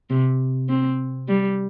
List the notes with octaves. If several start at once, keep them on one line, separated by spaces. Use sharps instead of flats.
C3
C4
G3